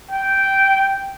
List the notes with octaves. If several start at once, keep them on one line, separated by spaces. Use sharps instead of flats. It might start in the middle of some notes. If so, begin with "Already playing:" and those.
G5